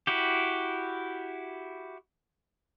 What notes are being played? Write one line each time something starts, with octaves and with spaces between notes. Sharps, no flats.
E4 F#4 G4